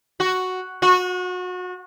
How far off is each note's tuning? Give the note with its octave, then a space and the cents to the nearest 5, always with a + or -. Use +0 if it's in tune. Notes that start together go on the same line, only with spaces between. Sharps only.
F#4 +0
F#4 -30